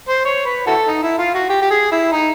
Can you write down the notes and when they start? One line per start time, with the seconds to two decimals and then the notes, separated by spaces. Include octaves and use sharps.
0.09 C5
0.25 C#5
0.46 B4
0.67 E4 F#4 A4
0.87 D#4
1.03 E4
1.18 F4
1.34 F#4
1.50 G4
1.62 G4
1.71 G#4
1.91 E4
2.12 D#4